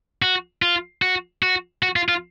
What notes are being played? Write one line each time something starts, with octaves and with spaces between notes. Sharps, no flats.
F#4
F4
F#4
F#4
F#4
F4
F4